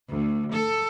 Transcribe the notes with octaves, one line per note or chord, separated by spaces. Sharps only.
D2
A4